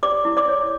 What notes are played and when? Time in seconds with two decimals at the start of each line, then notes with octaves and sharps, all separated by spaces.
0.03 G4 D5 D6
0.25 E4
0.37 D5 D6
0.48 C#5